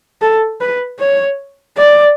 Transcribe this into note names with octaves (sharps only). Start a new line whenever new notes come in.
A4
B4
C#5
D5